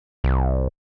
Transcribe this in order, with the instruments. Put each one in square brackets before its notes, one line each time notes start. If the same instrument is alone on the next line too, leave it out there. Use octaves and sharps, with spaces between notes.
[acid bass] C2